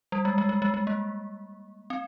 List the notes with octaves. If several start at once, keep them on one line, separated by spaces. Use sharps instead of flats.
G3
G#3
G#3
G#3
G#3
G#3
A#3
C4